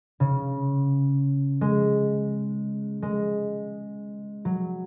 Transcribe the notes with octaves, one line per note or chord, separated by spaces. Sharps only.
C#3
G#3
G#3
F#3